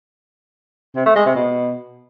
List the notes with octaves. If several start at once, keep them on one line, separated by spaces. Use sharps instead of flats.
C3
A3
G#3
C3
B2